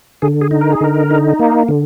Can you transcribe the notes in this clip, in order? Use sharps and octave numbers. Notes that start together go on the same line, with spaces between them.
D3 G#4
G#4
D#4
A#4
G#4
D3 A#4
D#4
A#3
D3